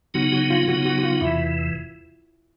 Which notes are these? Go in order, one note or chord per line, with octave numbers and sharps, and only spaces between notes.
C#3 F#3 B3 D#4 F#4
F#4
F4
C#3 F#3 B3 D#4 F#4
F#4
F#4
F4
E2 C3 E3 E4